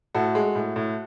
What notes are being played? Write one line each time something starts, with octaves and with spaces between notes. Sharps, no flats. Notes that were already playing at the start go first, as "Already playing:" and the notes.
A2 F#4 A4
G#3
A2
A2